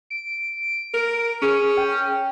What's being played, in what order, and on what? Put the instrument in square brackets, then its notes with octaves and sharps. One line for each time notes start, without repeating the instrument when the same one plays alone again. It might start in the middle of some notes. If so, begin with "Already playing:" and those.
[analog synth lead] D7
[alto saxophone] A#4
[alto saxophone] C#4 [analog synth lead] G#4
[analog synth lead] G5